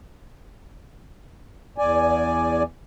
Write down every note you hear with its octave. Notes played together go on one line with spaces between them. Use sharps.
E2 D5 G#5